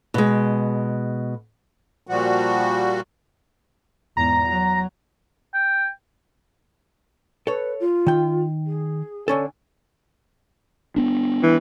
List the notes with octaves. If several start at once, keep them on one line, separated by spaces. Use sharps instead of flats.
B2 G#3
A#2 F3 G3 F#4
E2 G#2 A#5
F#3
G5
A4 B4 C#5
F4
D#3 G5
G#4
D3 C#4 A4 G#5
B3 D4
E3